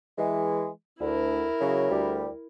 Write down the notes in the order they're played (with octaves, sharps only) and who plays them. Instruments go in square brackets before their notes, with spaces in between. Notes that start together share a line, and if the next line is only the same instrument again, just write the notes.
[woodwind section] E3 G#3
[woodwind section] D2 [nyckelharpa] E4 A#4
[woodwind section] C#3 F#3
D2 G3